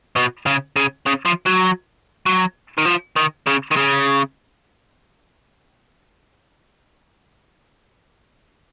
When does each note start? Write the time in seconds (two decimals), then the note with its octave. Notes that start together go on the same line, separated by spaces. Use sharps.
0.16 B2
0.46 C#3
0.76 C#3
1.06 C#3
1.25 F3
1.46 F#3
2.26 F#3
2.78 D#3
2.86 F3
3.16 D#3
3.47 C#3
3.71 D#3
3.76 C#3